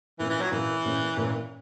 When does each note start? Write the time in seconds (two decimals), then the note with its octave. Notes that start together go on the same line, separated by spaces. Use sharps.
0.19 A#2 E3 A#3 C#4
0.30 E3
0.41 F#3
0.52 A#2 E3 A#3 C#4
0.85 A#2 A#3 C#4
1.17 A#2 A#3 C#4